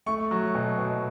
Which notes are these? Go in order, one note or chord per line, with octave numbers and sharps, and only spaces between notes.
A3 C#6
F#3
B2
B2